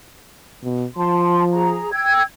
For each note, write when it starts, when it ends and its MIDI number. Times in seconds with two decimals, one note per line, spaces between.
0.63 0.85 47
0.97 1.83 53
0.97 1.44 81
0.97 1.44 84
1.53 1.92 68
1.53 1.92 82
1.93 2.22 79
1.93 2.22 88
1.93 2.22 92